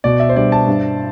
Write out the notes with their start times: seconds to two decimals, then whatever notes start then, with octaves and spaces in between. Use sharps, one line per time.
0.04 B2 D5
0.20 E5
0.29 C5
0.36 G3 D4 D5
0.52 A5
0.67 G2